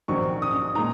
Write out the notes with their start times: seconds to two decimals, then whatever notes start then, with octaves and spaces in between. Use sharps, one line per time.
0.08 A#1 G#2 D#3 F#3 C4 C#6
0.42 D#6
0.75 A#2 G#3 D#4 A#5